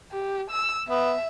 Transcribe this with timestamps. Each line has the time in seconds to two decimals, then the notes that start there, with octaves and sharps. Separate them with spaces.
0.12 G4
0.50 E6
0.89 B3 E5